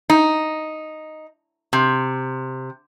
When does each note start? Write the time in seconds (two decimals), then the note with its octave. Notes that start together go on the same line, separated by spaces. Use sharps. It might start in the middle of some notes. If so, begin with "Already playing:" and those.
0.10 D#4
1.73 C3